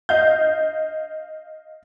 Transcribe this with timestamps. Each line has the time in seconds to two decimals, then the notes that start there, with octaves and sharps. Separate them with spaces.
0.09 D#5 F5 G6